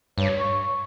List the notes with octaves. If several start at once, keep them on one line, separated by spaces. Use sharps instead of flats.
G2 C#5
C#6